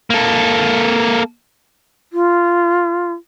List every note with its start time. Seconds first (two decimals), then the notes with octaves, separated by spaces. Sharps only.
0.10 A#3 A4
2.12 F4